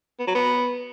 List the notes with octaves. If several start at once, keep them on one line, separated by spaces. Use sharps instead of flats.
B3
F#3
B3